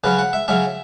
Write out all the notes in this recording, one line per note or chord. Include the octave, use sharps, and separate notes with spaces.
C#3 F#3 C#4 B4
F#5
E5
C#3 F#3 C#4 E5